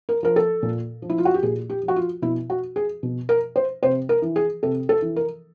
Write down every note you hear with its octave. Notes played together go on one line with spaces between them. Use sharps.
A#4
F3 A#4
A4
A#2
F3
E4
F4
F#4
G4
A#2 G#4
G4
F3
F#4
F4
B2 E4
F#4
G#4
B2
A#4
C5
C3 C5
A#4
E3
G#4
C3 A4
A4
E3
A#4